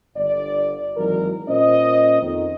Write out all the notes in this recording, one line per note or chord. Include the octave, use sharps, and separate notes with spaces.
G1 D5
G#1 E3 F#3 A#4
A#2 C#4 C5 D#5
F2 D#3